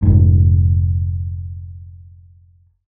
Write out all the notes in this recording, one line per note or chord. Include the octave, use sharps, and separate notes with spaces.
F1 G#2